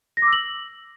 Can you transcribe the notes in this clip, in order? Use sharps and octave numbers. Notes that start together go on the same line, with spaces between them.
A#6
D6
E6
F#7